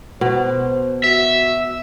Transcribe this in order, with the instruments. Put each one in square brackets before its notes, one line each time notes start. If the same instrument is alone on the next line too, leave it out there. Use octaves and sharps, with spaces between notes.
[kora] B2 [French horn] C5
[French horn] F#4 [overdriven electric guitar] E5